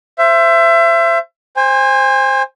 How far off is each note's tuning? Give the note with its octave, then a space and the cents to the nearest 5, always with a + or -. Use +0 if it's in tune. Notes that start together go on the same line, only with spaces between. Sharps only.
C5 +0 E5 +30
C5 +10 G#5 -35